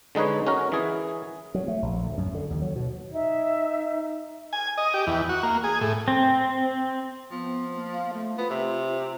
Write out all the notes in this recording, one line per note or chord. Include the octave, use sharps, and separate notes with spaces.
D3 G#3 D#4 B4 C#5
C#4 F#4 A#4
E3 G#4
F#3
A3
A#1
D2
F#2
D3
D#2
F#3
B2
D#4 E5
G#5
D#5
G4
E2
F#4
A#3
G#4
A2
C4
F3 B3
A#3
F5
A3
B3 F4
C3